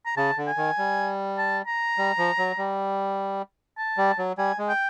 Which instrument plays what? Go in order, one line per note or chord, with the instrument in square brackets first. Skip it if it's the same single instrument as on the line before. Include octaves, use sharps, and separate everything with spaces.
[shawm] A#5
[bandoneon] C#3 [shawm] A5
[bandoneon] D3
[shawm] G#5
[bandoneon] D#3
G3
[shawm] A5
A#5
[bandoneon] G3
F3
F#3
G3
[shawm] A5
[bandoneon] G3
F#3
[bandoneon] G3 [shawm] G#5
[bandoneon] G#3
[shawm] G5